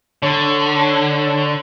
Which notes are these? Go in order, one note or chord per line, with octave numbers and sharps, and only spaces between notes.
D3 C#5